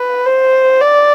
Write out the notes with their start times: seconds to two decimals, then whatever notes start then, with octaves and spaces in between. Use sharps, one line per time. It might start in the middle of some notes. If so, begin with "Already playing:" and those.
Already playing: B4
0.26 C5
0.81 D5